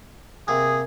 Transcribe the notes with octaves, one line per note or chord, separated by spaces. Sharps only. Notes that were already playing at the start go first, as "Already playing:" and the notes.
C3 A#3 C4 G#4